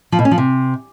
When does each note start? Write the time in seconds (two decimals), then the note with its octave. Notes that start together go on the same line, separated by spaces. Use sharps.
0.12 F3
0.19 B2
0.25 C#4
0.31 F3
0.38 C3